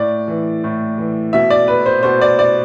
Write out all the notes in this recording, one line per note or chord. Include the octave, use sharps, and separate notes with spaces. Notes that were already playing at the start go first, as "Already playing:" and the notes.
Already playing: A2 D5
E3
A2
E3
B2 E5
D5
B4
C5
B2 C5
D5
D5